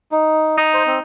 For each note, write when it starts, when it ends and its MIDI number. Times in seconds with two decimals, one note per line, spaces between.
0.12 0.57 63
0.58 1.02 63
0.74 0.83 72
0.87 0.99 60